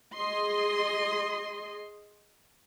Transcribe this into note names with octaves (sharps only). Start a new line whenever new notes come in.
G#4 D#5 C6